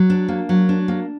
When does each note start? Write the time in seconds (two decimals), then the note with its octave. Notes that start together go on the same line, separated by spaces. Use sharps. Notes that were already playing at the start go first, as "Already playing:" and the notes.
Already playing: F#3
0.10 D4
0.28 A#3
0.49 F#3
0.69 D4
0.88 A#3